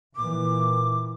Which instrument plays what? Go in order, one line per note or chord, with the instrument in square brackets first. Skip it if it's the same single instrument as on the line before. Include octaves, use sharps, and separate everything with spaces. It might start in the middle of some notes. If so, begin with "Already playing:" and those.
[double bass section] A#2 E3 [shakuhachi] D6